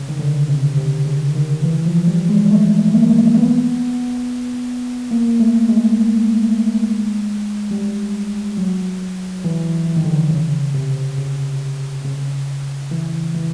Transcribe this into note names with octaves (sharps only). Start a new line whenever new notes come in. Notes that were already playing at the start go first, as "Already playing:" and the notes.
Already playing: C#3
D#3
D3
C3
C3
C#3
D#3
E3
F3
G3
G#3
A3
A#3
B3
A#3
A3
G#3
G3
F#3
E3
E3
D#3
D3
D#3
C#3
C3
C#3
C#3
E3
E3